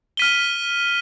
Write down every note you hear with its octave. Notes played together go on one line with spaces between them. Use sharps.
F6 B6 D#7 G7